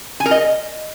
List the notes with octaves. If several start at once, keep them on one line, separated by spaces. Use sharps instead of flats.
G#5
A#4
D#5